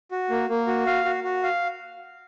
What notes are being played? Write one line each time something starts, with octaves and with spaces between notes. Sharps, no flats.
F#4
A#3
A#3
F#4
F5
F#4
F#4
F5